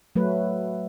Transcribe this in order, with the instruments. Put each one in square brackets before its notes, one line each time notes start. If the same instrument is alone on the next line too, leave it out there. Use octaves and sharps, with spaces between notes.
[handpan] F#3 A3 B4